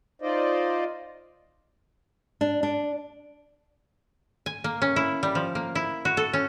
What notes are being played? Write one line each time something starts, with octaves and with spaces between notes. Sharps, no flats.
D#4 F4 C5 D5 D#5
D4
D4
G#5
A#3
C#4
E4
G3
F3
A#3
E4
F#4
A4
C#4